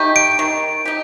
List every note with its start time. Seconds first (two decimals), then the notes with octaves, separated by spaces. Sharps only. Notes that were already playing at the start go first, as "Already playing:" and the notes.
Already playing: A3 D#4 G4
0.16 D7
0.39 D#3
0.85 D#4 G4